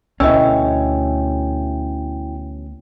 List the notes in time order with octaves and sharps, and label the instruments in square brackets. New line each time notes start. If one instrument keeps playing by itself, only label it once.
[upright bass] D2 [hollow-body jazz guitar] B2 A3 C#4 [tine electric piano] E4 G5 [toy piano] D#5 E6